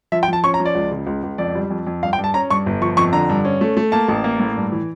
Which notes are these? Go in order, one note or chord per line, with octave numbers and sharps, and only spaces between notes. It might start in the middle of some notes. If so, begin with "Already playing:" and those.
F3 E5
G5
F3 A5
C#4 C#6
A#5
F3
D5
C#2
C#3
C#2
C#2
F2 D5
G3
F2
F2
G2 F5
G5
G2
A5
C#4 A#5
G2 C#6
G1
F3 C#6
F2 C#6
D3 A#5
G2
C#4
A3
A3
A#3 A5
A1
A#3
A2
G2
E3